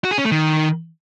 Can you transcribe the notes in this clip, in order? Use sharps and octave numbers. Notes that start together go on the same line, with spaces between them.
F#4
G#4
C#4
A3
D#3